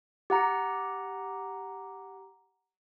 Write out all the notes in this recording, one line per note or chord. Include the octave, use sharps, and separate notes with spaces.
G4 F#5 A#5